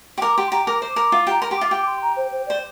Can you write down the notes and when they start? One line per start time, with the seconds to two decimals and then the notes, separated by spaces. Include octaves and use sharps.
0.18 G4
0.22 A#4 D6
0.37 G4 C6
0.52 G4 A#5
0.67 A#4 D6
0.82 C5
0.96 A#4
1.12 F4
1.27 G4 A#5
1.42 A#4 C6
1.51 G4
1.57 F4 D6
1.71 G4 D6
1.87 C6
2.02 A#5
2.16 C5
2.31 C5
2.46 C5 D5